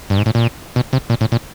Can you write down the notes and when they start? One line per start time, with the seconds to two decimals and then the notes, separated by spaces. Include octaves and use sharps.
0.10 G2
0.18 G#2
0.26 A2
0.35 A#2
0.76 B2
0.93 C3
1.10 A#2
1.21 A2
1.32 A#2